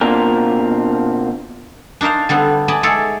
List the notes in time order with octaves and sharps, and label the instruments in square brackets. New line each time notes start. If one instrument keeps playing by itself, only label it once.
[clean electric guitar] B2 A#3 C4 D4 F4 A#4
[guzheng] D4 D#4 A#4 C5 F5
D3 G3 B3 C4
D5 D#5 G#5 A5 B5
G#3 D#4 A4 C#5 D5 E5